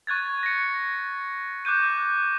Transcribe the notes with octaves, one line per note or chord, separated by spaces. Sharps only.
C#6 F#6 G#6 A6
A#6 C#7
D6 F#6 G6 D#7